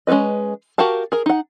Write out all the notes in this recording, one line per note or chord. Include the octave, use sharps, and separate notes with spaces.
G#3 C#4 E4 B4 D#5
F#4 G4 A#4 F5 A5
G#4 A#4
D#4 F#5